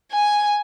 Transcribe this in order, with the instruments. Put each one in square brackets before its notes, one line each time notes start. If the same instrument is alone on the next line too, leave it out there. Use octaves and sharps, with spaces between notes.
[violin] G#5